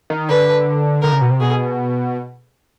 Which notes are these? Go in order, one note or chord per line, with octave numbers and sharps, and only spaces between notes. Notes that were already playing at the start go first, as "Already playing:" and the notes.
D#3
D3 B4
D3 A#4
C#3
B2
C3
B2 G#4